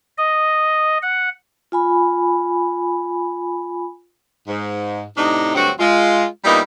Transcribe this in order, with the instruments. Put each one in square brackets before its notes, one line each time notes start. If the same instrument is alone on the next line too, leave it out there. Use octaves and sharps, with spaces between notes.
[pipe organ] D#5
F#5
[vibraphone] F4 G#5 B5
[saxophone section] G#2
A2 C3 D4 D#4
D2 G2 F#3 C4 F#4
G#3 F4
A#2 G3 A#3 B3 D#4 E4